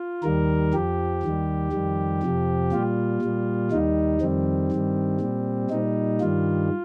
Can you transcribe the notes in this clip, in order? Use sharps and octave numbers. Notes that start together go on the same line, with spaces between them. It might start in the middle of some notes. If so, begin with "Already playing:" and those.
Already playing: F4
D#2 D#3 G3 A#4
F2 F3 G4
D#2 D#3 G3
F2 D#3 G3
F2 C3 F3
A#2 G3 F4
A#2 G3
D#2 D#3 G3 D#4
F2 D#3 G3 C4
G2 D#3 G3
A#2 G3
A#2 G3 D#4
G2 D#3 G3 F4